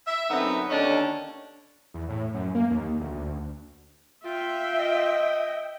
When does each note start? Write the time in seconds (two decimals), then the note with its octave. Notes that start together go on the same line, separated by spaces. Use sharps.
0.07 E5
0.30 F#2 D3 B3 C4 D#4
0.70 D#2 D3 C#4 D4 D#5
1.94 E2
2.09 A2
2.34 F#2
2.55 A#3
2.71 D#2
3.00 D2
4.25 F4 E5 G5
4.80 D#5